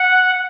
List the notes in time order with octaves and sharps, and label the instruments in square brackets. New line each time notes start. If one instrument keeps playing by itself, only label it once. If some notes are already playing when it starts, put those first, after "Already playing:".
Already playing: [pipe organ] F#5